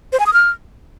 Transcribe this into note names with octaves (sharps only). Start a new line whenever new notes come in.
C5
G#5
D#6
F6